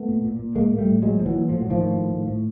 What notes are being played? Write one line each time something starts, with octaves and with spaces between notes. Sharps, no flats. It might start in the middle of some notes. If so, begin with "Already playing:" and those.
Already playing: A3 B3
A#2
A#2
A#2
A2 G#3 A#3
A2
G3 A3
A2
A#2 F#3 G#3
A#2 F3
E3 F#3
A#2
A2 F3
F#3
A2
D#3 F3
A2
A2
A2
A2